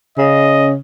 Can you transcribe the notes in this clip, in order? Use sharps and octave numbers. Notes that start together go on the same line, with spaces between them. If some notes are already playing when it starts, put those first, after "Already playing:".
C#3 D#5